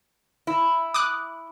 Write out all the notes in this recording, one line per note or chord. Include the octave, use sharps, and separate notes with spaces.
E4
D6 D#6 F#6